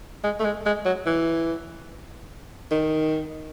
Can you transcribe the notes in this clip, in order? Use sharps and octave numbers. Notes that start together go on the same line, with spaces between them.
G#3
A3
G#3
G#3
F#3
E3
D#3